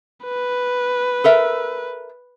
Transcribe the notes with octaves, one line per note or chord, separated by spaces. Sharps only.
B4
A4 A#4 E5